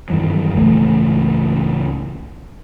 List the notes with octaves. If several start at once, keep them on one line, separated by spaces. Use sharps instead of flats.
G2 D#3 E3 F#3
C#2 A2 E3 A3